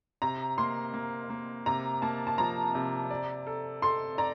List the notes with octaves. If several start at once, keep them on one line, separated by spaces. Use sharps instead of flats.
C3 A#5
A#3 C6
A#3
A#3
C3 A#5
A#3 A5
A5
F3 A#5
C3
D5
A4
A4 C6
D5 A#5